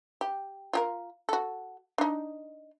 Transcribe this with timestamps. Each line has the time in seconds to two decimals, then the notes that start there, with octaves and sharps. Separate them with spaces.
0.21 G4
0.73 F4 G4 A#4
1.29 F#4 A4
1.98 D4 D#4